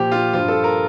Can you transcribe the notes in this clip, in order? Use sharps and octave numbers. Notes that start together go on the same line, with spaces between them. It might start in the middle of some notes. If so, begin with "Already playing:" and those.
Already playing: A#2 F3 G4
F4
G2 F3 F4
A4
A#4